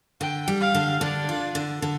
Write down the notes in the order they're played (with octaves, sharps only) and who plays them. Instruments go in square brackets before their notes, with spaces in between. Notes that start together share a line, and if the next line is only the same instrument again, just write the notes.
[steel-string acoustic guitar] D3 [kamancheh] G5
[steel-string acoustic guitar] G3
[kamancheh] F5
[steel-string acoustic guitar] D3
[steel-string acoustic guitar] D3 [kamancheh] D4
[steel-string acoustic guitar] F4
D3
D3